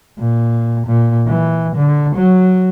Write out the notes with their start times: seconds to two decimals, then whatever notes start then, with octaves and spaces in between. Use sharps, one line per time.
0.18 A#2
0.86 A#2
1.27 E3
1.76 D3
2.16 F#3